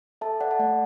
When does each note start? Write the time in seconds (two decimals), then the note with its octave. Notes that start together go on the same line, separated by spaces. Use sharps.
0.21 A4 E5 A5
0.41 A4 D5 F#5
0.51 A5
0.59 A3 D5 F#5